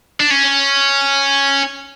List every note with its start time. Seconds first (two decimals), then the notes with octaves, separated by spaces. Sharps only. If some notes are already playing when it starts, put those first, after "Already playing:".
0.20 D4
0.31 C#4